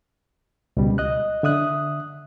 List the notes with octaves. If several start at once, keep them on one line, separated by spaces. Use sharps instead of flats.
C#2 B2 G3
D#5 F#6
D3 E5 D#6 F#6